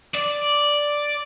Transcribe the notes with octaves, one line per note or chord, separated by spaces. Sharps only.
D5